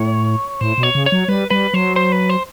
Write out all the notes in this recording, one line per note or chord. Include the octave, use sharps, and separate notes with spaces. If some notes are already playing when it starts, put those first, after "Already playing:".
Already playing: A2 C#5
A2 C5
B2
C#5
C#3
C#5
F#3
G3 B4
G3 B4
F#3 C5
C5
B4
C5